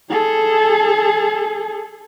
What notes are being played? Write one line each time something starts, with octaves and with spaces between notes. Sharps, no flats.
G#4 A4